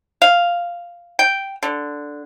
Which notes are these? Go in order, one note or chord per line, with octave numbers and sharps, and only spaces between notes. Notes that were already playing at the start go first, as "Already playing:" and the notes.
F5
G5
D3